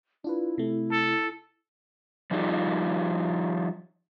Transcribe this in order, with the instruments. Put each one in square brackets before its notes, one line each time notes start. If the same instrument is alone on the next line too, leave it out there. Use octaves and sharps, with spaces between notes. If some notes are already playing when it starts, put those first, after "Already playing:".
[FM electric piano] D4 F4 B4 [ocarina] E4
[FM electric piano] C3 A3
[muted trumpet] A4
[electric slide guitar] F3 G3 D#4 F4 G#4